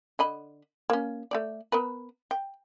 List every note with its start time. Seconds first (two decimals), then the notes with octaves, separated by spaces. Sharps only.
0.19 D3 D#5 B5
0.90 A#3 C#4
1.31 A3 C4 D5
1.72 B3 A#4 B4
2.31 G5